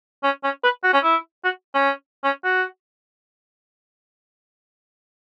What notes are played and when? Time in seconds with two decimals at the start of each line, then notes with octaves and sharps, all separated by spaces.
0.24 C#4
0.44 C#4
0.64 B4
0.84 F#4
0.93 C#4
1.04 E4
1.44 F#4
1.74 C#4
2.24 C#4
2.44 F#4